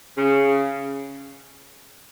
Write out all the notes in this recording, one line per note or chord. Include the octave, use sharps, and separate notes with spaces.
C#3